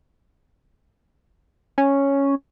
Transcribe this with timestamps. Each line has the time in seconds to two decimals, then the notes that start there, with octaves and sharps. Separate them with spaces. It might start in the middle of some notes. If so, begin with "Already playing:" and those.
1.78 C#4